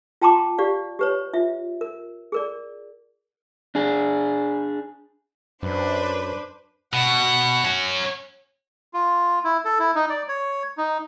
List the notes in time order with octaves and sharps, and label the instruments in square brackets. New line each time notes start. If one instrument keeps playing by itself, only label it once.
[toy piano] F4 G5 A5 A#5 C6 D6
G4 D5 F5
G4 B4 C#5
F4 E5
A#4
G#4 A#4 D5
[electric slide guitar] D4 G#4
[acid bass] F#2 [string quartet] D4 B4 C5
[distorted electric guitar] B2 [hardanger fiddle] F#5
[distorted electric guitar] C#4 F#4
[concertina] F4
E4
A4
E4
D#4
D5
C#5
D#4